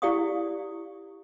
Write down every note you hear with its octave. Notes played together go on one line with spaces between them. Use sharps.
E4 G4 D5 F5 C#6 D#6